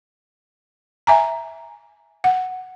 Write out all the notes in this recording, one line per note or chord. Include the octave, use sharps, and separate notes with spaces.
E5 G#5 A#5
F#5